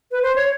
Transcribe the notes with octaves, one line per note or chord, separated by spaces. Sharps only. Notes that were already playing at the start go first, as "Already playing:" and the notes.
B4
C5
C#5